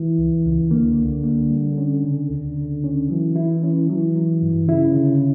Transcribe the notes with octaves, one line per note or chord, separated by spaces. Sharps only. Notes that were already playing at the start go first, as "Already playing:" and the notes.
Already playing: E3
C#2
C#2
D3 A#3
C#2
A#3
G3
C#4
C#3
D2 D3
C#3
C#4
E3 F#3
E4
C#4
E3 F#3
F#3
G2
C#3 E4
D3